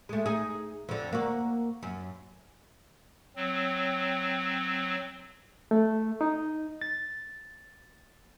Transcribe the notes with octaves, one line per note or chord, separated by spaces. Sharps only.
G#3 A3
D#4 G#4
F2 D3
A#3 F#4
F#2
F#3 C4
A3
D#4
A6